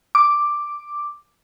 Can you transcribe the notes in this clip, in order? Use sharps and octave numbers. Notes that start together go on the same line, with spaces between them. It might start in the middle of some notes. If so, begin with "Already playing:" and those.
D6